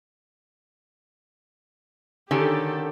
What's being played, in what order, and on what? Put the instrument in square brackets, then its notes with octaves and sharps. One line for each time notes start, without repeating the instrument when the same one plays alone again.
[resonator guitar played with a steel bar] D3 D#3 C#4 [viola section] G4 A4